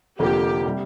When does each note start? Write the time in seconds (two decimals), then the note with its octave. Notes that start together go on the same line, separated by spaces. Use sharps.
0.19 F1 F2 D3 F3 A#3 G4
0.66 C3 G3